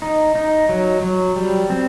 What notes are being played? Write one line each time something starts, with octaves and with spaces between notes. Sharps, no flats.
D#4
D#4
F#3
F#3
G3
C4